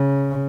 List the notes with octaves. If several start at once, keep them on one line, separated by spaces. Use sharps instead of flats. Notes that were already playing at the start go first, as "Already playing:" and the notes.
Already playing: C#3